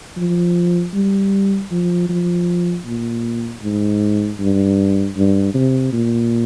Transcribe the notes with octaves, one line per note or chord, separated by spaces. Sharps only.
F3
G3
F3
F3
A#2
G#2
G2
G2
C3
A#2